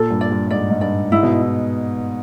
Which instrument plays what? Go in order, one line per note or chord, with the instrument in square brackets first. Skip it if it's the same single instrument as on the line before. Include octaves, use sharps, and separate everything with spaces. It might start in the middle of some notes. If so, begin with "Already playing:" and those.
Already playing: [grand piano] A#2 [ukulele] A4
[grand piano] G2
[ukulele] D5
[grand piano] G2
[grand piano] G#2 [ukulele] D5
[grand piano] G#2
[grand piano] G2 [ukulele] D5
[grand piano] G#2 [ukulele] E4
[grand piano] B2